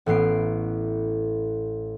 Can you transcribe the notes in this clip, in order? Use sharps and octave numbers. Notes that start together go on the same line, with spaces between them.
A1 A2 B3 C7 D7